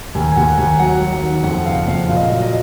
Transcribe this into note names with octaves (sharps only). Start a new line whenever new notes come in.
D#2 G#5
G#5
D#2 F#5
D#2 G#5
F#3 F#5
F#3
F#5
D#3
F2 F#5
F#1 F5
F2 F5
A#2 F5
D#5
F5
F#3
D#5